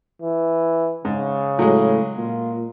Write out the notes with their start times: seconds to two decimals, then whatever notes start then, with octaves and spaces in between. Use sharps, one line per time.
0.22 E3
1.05 G#2 C#3
1.59 A2 F#3 G#3
2.17 A#2 F4